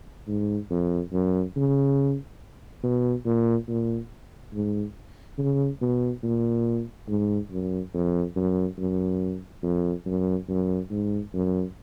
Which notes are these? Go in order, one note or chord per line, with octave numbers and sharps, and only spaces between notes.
G#2
F2
F#2
C#3
B2
A#2
A#2
G#2
C#3
B2
A#2
G#2
F#2
F2
F#2
F#2
F2
F#2
F#2
G#2
F#2